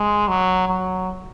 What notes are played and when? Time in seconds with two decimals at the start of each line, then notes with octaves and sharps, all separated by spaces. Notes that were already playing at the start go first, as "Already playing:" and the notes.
Already playing: G#3
0.28 F#3
0.68 F#3